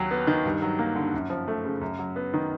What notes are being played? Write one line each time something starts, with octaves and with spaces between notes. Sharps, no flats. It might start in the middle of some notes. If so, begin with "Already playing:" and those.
Already playing: D#2 F#3
B3
D#3
G2
F#3
A#3
D3
F#2
F3
A3
C#3
F#2
F#3
B3
D#3